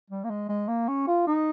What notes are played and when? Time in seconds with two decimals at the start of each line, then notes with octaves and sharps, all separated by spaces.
0.10 G3
0.24 A#3
0.30 G#3
0.49 G#3
0.68 A#3
0.88 C#4
1.07 F4
1.27 D#4